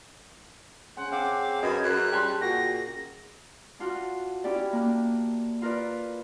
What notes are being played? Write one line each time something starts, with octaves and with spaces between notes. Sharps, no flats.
C#3 C5 F#5 G#5
C#3 C4 F5 F#5 D6
F#2 B4 D#5 G#6
F#2 F#6
G3 G5 A5 C6
A#2 F#4 G5 A#6
D4 F4 F#4
C#4 E4 G4 D5
A#3 D4
F4 A#4 B4 D5